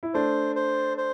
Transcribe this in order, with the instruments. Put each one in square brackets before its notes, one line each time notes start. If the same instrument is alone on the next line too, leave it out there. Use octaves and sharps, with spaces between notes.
[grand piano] E4
[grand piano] A3 D4 [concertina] C5
[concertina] C5
C5